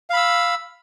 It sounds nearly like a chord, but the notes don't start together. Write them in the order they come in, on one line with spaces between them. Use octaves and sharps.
F5 B5 E6